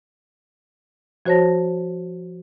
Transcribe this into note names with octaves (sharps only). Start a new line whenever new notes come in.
F3 F#4 C5 C#5 A5 A#6